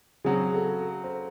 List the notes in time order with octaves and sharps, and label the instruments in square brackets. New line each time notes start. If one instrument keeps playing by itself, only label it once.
[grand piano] C#3 F#3 C4 F#4 [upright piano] G#4
[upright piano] A4
C5